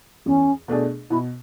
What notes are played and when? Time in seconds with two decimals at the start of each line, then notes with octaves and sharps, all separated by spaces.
0.26 E2 C#4
0.68 B2 A3 D4 G#4
1.10 B2 E4